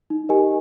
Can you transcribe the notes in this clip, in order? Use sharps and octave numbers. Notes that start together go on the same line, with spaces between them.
D#4
G4 A#4 D#5 G#5